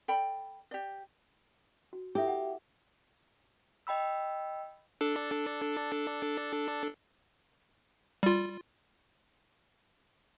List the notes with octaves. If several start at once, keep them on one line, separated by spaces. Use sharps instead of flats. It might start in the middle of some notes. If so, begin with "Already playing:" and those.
A4 D5 G5 B5
G4 D5
F#4
E4 G4 A4 E5
F#5
D#5 G5 B5 E6
D4 A4
G3 F4